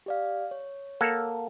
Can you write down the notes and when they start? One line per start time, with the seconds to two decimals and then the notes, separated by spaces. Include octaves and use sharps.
0.06 G4 D5 F5
0.51 C#5
1.01 A#3 A4 F#5